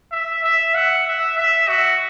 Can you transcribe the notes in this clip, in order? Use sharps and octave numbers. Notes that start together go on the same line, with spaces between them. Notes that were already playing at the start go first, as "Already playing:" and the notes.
E5
E5
F#5
E5
E5
F#4